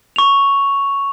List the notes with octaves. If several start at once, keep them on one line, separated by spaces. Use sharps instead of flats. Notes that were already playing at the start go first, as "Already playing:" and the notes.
C#6 F7